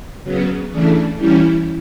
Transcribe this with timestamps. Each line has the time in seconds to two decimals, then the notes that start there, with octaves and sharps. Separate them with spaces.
0.23 C#3 F#3 B3
0.70 C#3 E3 A3 D4
1.18 E3 G3 C#4 E4 G4